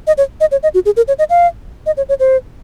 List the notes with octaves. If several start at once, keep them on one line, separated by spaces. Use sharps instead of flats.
D#5
C#5
D#5
C#5
D#5
F#4
G#4
A#4
C#5
D#5
F5
D#5
C#5
C#5
C5